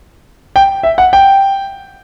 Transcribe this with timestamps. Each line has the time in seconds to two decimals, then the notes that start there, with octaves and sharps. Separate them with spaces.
0.56 G5
0.83 E5
0.98 F#5
1.13 G5